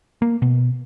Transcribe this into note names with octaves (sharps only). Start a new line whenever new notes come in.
A#3
B2